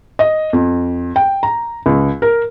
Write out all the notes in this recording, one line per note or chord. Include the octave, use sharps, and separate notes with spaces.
D#5
F2
G5
A#5
C#2
A#4